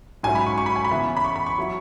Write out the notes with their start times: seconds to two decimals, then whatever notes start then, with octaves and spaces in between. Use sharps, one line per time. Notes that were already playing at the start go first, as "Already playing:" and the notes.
0.23 G#2 F#3 C#4 E4 G#5
0.35 B5
0.46 C#6
0.58 C#6
0.66 B5
0.76 G#5
0.84 B5
0.91 C#3 E3 B3 E4
1.17 B5
1.25 C#6
1.36 B5
1.46 C#6
1.59 F#3 E4